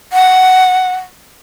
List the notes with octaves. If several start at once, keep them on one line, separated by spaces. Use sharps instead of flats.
F#5